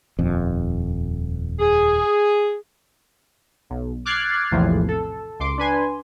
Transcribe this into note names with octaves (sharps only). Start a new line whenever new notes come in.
D#1 F2
G#4
B1
D6 F6 F#6 G#6 A6 C7
A#1 E2 A2 C3 E3 F3
A4
C#2 C6 D6
D4 B4 G#5 C6